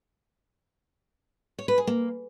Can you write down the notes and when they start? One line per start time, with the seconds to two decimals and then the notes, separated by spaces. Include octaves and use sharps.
1.58 C#5
1.68 B4
1.78 G#4
1.87 A#3